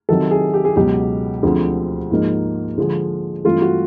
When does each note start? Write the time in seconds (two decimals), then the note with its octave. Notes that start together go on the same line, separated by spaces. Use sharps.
0.09 C3 D#3 F#3 A4
0.31 G#4
0.54 G4
0.65 G#4
0.76 C#2 B2 F#3 G4
1.43 D2 D3 F3 G#3 C4
2.11 G#2 F3 A#3 D#4
2.78 D3 F3 G#3
3.45 G2 E3 A3 C4 F4
3.62 F#4